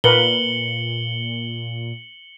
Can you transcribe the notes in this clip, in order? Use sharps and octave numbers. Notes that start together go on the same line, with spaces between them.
A#2 A#4 B4 C#7 F#7 G7